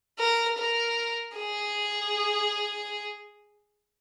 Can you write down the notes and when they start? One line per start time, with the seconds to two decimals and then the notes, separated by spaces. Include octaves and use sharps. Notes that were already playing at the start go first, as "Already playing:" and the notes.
0.19 A#4
0.58 A#4
1.38 G#4